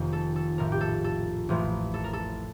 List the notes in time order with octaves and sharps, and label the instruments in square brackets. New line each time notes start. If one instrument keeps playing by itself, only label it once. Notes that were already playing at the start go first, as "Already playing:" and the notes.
Already playing: [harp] F1 F2 D#3 A#3 D#4
A4
A4
A#1 A2 F3 A#4
G4
A4
A4
A1 A2 F3 A#3
A4
A#4
A4